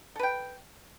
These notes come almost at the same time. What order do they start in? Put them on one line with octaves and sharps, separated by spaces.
A4 B4 G5